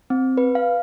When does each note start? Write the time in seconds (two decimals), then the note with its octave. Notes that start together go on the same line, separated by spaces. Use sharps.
0.10 C4
0.37 B4
0.55 F5